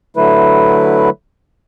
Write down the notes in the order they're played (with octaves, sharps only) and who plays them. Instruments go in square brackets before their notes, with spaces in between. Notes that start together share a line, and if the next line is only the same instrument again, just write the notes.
[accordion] D3 F#3 A3 E4 B4